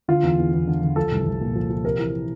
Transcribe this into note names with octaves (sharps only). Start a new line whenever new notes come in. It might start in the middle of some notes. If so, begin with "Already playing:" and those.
D3 F4
E2
E2
E2
D3
D3
F3 A4
C2
C2
A#2
F3
F3
C3 A#4
E3